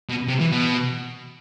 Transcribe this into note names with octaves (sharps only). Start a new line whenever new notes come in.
B2
C3
E3
B2